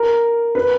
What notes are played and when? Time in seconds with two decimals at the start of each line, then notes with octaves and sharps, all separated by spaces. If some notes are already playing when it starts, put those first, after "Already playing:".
Already playing: A#4
0.55 B4